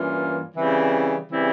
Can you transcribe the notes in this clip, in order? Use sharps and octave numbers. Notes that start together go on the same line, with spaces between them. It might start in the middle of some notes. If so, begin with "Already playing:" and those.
Already playing: G2 E3 A#3 C#4 F4
C#3 E3 G3 C4 E4
C#3 E3 G3 C4 E4